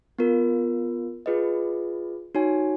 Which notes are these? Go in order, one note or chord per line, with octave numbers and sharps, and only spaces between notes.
B3 F4 A#4
F4 G#4 B4 D#5
D#4 F#4 C#5 G#5